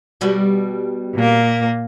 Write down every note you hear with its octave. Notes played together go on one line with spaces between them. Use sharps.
B2 G3 B3
A#2 A#3